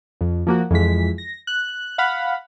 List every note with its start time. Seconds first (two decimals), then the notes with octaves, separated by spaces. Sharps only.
0.21 F2
0.47 F3 A#3 F#4
0.71 F2 E3 G#3 B6
1.18 A#6
1.47 F#6
1.98 F5 F#5 B5